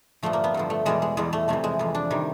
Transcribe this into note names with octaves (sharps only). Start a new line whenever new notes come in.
G2 D3 F3 A3
A#3
B3
G2 D3 F3
A3
E2 B2 G3 G#3
G#3
E2 B2 G3 G#3
A3
F2 C3 E3 A3
G#3
F2 C3 E3
D4
C3 D#3 G3